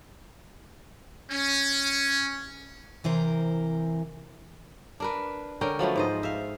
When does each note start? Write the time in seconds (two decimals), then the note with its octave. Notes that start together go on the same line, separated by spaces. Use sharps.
1.31 C#4
3.04 C3 E3 A#4 C5
5.00 D4 A#4 B4
5.61 D3 C#4 A#4 G5
5.79 F3 F#3 A3 B3
5.96 G#2 C5 D#5
6.23 E5 F5